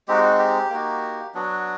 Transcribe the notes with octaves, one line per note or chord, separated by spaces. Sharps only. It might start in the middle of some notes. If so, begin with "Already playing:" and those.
G#3 C4 D#4 F#4 G4
F#4
G4
A#3 D#4 F#4
F#3 B3 D4 F#4